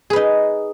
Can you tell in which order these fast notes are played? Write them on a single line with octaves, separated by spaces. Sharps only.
G#4 B4 D#4